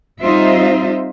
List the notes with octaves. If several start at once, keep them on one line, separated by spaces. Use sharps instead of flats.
G3 C4 D#4 F4 C5 E5